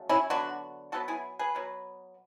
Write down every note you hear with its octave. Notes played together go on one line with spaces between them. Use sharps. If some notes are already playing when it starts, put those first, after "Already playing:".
Already playing: C#3 F#3 A3
C#4 E4
D3 F#3 B3 D4 F#4
B2 F#3 B3 F#4 A4
E4 G#4
G#4 B4
B2 F#3 B3